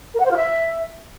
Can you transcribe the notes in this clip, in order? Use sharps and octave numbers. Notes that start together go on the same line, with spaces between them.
A#4
F#5
C5
F4
E5